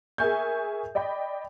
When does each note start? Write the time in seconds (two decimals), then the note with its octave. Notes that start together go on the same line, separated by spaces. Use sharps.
0.18 G#4 A#4 E5 G#5 C#6 G6
0.95 D5 D#5 G5 B5